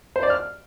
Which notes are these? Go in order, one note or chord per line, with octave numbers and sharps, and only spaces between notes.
C5
D5
F6